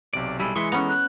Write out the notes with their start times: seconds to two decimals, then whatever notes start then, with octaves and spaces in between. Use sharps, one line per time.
0.14 B1 C3 D5 D7
0.40 G3 E4 G#4 A4
0.56 E3 G#3 E5 C6 C#6 D#6 C#7
0.72 B3 C#4 A4 A#5
0.89 F#6